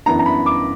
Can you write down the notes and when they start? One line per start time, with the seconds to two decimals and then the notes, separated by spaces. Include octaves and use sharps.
0.06 F#2 E3 B3 D4 A#5
0.19 A#5
0.26 B5
0.46 D6